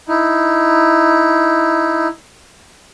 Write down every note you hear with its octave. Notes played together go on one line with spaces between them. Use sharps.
D#4 E4